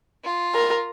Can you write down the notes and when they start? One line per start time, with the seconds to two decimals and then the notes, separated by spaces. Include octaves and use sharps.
0.24 F4
0.55 A#4